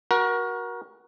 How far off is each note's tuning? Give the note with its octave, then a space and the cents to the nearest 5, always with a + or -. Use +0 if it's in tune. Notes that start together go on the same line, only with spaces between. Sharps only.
F#4 +0 A#4 +30